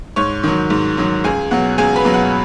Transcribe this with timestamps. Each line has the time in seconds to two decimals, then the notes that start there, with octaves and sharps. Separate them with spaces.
0.16 G#2 C#5 C#6
0.44 D#3 F#3
0.70 G#2
0.97 D#3 F#3
1.24 C#2 G#4 G#5
1.51 B2 F#3 F#5
1.78 C#2 G#4 G#5
1.96 B4 B5
2.05 B2 F#3
2.14 F#5